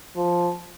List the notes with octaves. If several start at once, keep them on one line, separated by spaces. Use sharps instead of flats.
F3